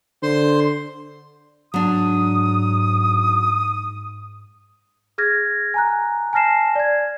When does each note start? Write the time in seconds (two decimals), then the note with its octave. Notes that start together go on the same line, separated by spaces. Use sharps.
0.23 D3 C5 C6
1.74 G#2 F#3 D4 D#6
5.18 G#4 F6 G#6 A#6
5.74 G#5 A#5 F#6
6.33 G#5 A5 F6 A#6 C7 E7
6.75 D5 G#6